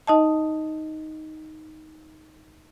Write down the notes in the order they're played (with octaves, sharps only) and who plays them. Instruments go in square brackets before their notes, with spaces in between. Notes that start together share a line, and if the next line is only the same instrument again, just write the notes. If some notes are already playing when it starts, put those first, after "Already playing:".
[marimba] D#4 D#5 A5